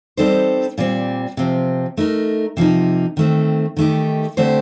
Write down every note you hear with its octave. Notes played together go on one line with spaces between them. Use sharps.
G3 C4 D#4 A4 C5
A#2 G3 C4
C3 F3 C4
A3 D#4 A#4
C3 F3 A#3 D#4
D#3 A3 C4
D#3 A3 D#4 G4
D3 A3 C4 G4 C5